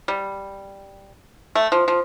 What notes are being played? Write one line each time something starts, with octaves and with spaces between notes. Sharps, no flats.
G3
A3
F3
F3